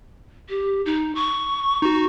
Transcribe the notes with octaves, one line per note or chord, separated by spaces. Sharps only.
G4
D#4
C#6
D#4 F#4